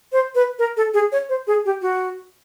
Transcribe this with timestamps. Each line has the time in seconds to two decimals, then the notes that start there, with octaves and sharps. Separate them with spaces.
0.12 C5
0.35 B4
0.59 A#4
0.77 A4
0.94 G#4
1.12 C#5
1.29 C5
1.47 G#4
1.65 G4
1.82 F#4